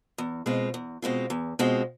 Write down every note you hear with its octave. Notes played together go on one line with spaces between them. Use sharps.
E2
B2 G#3 C4 F4
E2
B2 G#3 C4 F4
E2
B2 G#3 C4 F4